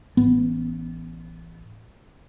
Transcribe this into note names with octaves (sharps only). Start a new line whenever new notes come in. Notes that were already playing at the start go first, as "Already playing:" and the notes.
A1 B3